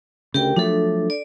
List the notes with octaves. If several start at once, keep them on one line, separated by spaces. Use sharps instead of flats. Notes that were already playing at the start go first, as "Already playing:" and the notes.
D2 C#3 G4 A#4 G5
F3 F#3 A3 D4 A4
D5